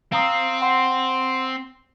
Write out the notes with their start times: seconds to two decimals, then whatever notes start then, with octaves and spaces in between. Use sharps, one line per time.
0.12 C4 F5 A#5 D#6
0.62 F#5 C6